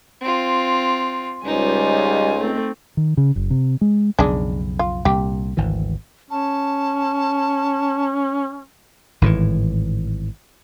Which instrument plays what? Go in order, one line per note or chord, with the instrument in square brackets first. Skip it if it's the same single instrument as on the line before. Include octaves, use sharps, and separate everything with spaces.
[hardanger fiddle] C4 F4
[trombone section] C#2 [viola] G3 G#5 [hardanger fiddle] D#4 C5
[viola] A3 C4
[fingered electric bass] D#3
C#3
F#1
C3
G#3
[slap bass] B1 F2 C#3 [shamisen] G#3 D4
[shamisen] F4
[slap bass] C2 A#2 [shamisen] G4
[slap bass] G#1 D2 E3
[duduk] C#4 [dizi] A5
[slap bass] G#1 A2 C3 E3